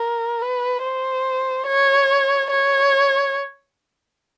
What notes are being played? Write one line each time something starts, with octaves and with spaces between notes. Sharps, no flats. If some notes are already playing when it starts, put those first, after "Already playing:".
Already playing: A#4
B4
C5
C#5
C#5